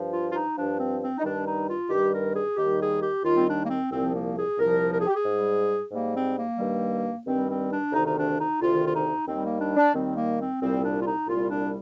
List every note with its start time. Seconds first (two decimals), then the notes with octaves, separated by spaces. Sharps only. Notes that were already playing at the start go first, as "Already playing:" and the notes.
Already playing: G2 F3
0.11 F4
0.29 F4
0.34 D#4
0.56 G2 F3 D4
0.77 C4
1.00 C4
1.18 D#4
1.22 G2 D#3 G3 D4
1.45 D#4
1.67 F4
1.89 G2 D#3 G3 G4
2.12 A#4
2.34 G#4
2.56 D#2 D#3 G3 G4
2.79 G#4
3.01 G4
3.24 D#2 D#3 G3 F4
3.35 C4
3.46 D4
3.63 A#3
3.68 C4
3.90 C2 A#2 F3 C4
4.13 A#3
4.35 G#4
4.57 C2 A#2 F3 A#4
4.91 A#4
4.99 G#4
5.06 G4
5.13 G#4
5.24 G#2 G3
5.91 G#2 G3 A#3
6.14 C4
6.37 A#3
6.58 G2 D#3 G3
7.25 G2 D#3 G3 C4
7.48 C4
7.70 D4
7.92 D2 C3 D#3 D#4
8.05 D#4
8.15 D4
8.37 D#4
8.60 D2 C3 D#3 F4
8.84 F4
8.93 D#4
9.26 D#2 D#3 G3 C4
9.43 A#3
9.60 D4
9.77 D4
9.93 D#2 D#3 G3 C4
10.15 A#3
10.38 C4
10.60 C2 A#2 G3 C4
10.83 D4
10.99 F4
11.04 D#4
11.27 C2 A#2 G3 F4
11.49 D4